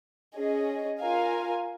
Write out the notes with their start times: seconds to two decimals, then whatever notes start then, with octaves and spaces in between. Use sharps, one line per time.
0.36 C#4 G#4 D#5
1.00 F4 A#4 F5 G#5